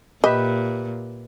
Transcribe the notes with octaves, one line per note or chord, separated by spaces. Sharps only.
A#2 G4 B4 D#5 E5